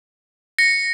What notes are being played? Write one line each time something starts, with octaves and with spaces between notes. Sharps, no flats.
A#6 C#7